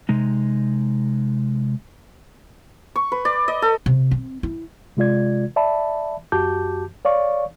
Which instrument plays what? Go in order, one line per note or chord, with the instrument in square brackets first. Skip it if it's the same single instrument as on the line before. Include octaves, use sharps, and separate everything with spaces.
[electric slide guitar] C3 G#3 D#4
[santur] C#6
B4
D5
D#5
A4
[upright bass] C3
C4
E4
[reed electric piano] C3 G#3 F4 D5 G#6
D5 E5 A5 B5
F#2 F#4 G4 A5 D6 G6
C#5 D5 F5 C#6